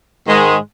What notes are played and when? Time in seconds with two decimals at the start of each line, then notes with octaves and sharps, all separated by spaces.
0.26 G#2 D#3 G#3